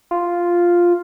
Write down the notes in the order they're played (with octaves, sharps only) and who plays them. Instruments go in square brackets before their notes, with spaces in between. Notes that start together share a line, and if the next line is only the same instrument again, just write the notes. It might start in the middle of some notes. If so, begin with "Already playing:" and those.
[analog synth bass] F4